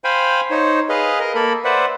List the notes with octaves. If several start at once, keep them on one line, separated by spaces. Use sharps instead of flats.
C5 F5 G5 G#5 B5
D#4 C5 C#5
G#4 B4 D#5 F5
A#4 D#5
A#3 A4 A#4 B5
B4 C5 D5 E5 F#5